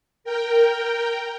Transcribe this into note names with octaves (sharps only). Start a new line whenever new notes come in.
A#4 G5